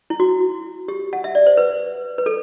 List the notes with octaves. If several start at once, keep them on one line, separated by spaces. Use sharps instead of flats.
E4
F#4
G4
F#5
E5
D5
C5
B4
B4
A4